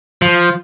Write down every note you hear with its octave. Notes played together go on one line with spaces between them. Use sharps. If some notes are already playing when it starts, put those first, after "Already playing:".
F3